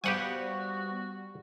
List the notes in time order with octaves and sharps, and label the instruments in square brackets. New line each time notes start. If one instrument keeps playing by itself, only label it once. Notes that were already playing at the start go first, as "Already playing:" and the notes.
[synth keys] G3 [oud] B3 C5 F5 [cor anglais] F#4 [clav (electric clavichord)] G4 F#5 G#5